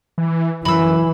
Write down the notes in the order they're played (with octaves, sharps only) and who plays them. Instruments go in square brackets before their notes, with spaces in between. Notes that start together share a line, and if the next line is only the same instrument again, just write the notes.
[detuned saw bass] E3
[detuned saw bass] F#2 [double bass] E3 [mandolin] B5 E6